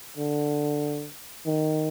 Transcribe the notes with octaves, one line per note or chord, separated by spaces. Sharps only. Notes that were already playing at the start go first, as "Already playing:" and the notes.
D3
D#3